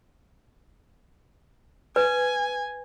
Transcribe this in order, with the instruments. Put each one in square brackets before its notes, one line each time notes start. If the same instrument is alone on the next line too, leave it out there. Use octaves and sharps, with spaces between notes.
[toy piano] B4 [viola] G#5